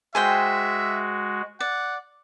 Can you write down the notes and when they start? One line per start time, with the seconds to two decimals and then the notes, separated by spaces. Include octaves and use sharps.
0.15 G#3 F#4 G#4 C5 E5 G5
1.60 D5 F#5